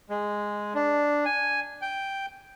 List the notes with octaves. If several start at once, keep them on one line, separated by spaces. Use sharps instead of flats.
G#3
D4
G#5
G5